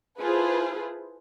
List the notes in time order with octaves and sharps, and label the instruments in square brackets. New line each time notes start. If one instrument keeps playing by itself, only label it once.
[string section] E4 F4 G#4 A4 B4 C5